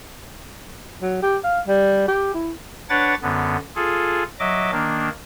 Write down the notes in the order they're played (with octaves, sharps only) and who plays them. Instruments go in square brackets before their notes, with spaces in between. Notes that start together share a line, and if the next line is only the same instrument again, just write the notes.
[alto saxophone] F#3
G4
F5
G3
G4
E4
[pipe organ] D4 B4 C#5 F#5 D6 A6
F#2 D3 B3
F4 G#4 A4
F#3 D#5 E5 D6
D#3 A#3 D4